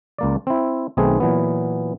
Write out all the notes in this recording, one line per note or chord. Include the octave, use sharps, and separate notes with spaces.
C#2 A#3 D5
C4 E4
B1 D#3 A3 C4 G#4 B4
A#2 E3 F#3 B3